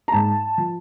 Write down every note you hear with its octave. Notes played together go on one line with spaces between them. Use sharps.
A#5
G#2 A5
F3